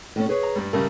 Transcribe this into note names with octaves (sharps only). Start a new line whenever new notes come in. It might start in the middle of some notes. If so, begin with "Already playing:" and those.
A2 A3 C#4
G#4 B4 C#5
A#5
G2 G3
C#3 G3 A3 A#4